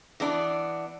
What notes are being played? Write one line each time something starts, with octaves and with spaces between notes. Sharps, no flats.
E3 B3 D4